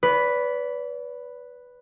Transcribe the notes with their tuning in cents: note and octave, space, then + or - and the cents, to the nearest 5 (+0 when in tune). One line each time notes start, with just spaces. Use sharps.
B4 +0 D5 -40